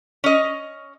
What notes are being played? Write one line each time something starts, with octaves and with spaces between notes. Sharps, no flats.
C#4 D#5